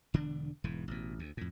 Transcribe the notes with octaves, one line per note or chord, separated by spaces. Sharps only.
E1 D3 D4
E1 G#2 E3
A1 B2
D2
F2 A2